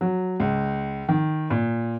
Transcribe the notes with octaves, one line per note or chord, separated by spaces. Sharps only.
F#3
C#2
D#3
A#2